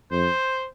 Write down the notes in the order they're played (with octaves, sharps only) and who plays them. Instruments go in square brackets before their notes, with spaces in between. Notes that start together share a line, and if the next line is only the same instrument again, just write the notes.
[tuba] F2 [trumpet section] C5